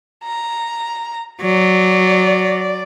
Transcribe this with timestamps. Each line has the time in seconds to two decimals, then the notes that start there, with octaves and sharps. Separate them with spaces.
0.24 A#5
1.42 F#3 D5